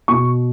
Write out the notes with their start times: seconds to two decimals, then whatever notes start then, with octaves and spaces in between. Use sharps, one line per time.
0.08 B2 C#6